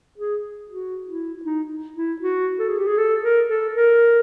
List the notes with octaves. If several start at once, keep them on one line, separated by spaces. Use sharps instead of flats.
G#4
F#4
E4
D#4
E4
F#4
A4
G#4
G4
G#4
A4
A#4
A4
A#4